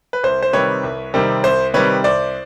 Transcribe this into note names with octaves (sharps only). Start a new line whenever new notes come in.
B4
C2 C5
C5
C3 D#3 G3 C4 B4 C#5
C2
C3 D#3 G3 C4
C2 C5
C3 D#3 G3 C4 B4 C#5
C2 C5 D5